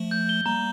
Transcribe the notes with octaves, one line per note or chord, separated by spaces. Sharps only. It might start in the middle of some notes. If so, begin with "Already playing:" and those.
Already playing: F3 A3
G6
G7
G3 A#3 A#5